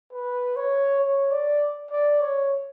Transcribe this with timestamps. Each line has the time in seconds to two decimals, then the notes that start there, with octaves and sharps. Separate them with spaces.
0.12 B4
0.57 C#5
1.01 C#5
1.31 D5
1.91 D5
2.21 C#5